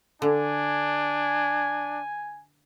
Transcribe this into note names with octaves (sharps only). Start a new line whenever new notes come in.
D3 D4 G#5